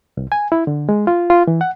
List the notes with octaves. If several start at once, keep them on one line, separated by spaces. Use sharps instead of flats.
C2
G#5
E4
D3
G#3
F4
F4
E3
F#5